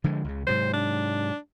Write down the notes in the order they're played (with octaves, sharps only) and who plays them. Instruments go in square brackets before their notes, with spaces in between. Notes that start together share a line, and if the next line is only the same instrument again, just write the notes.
[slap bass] D3 F3 G#3
C#2 C#3
[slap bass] G#2 C3 F#3 [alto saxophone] C5
[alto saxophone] D4